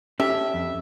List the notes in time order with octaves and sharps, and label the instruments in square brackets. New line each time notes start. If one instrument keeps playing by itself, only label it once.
[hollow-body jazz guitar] C#4 G4 A4 [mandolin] E5
[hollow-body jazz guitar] F2